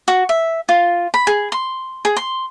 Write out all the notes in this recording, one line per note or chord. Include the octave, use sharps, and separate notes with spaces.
F#4
E5
F4
B5
G#4
C6
G#4
C6